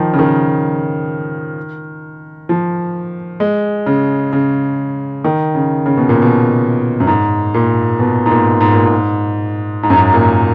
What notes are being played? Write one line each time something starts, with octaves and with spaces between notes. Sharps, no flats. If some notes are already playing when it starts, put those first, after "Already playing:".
Already playing: D#3 F3
C#3
D#3
F3
G#3
C#3
C#3
D#3
C#3
C#3
B2
A#2
B2
F#2
G#2
A#2
B2
G#2
A#2
G#2
A#2
G#2
G#2
F#2
G#2
A#2